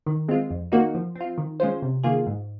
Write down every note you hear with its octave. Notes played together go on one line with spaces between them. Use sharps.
D#3
G#3 C4 F4
F2
D#3 A#3 D#4 F#4
F3
C4
F4
D#3
G#3 C#4 F4 C5
C3
D#3 A#3 F4 G#4
G#2